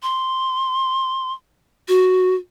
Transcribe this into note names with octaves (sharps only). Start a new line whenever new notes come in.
C6
F#4